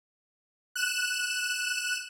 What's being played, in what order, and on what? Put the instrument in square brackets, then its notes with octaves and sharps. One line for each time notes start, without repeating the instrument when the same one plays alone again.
[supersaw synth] F#6 E7